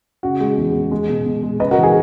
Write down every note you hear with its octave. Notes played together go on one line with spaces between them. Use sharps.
C#3 F#4
G#3
E2
E2
G#3
B2
B2
G#3
C#3 B4 D#5
F#4 A#4
E3
G#4